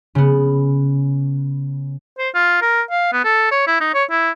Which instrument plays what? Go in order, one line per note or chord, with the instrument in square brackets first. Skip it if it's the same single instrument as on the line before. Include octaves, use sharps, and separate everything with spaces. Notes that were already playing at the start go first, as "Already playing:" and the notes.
[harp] C#3 B3
[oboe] C5
F4
A#4
F5
B3
A4
C#5
E4
D#4
C#5
E4